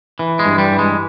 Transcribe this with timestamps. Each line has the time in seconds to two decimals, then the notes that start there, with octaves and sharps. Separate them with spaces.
0.19 E3
0.39 G#3
0.46 G2
0.58 G3
0.72 E3
0.79 G#3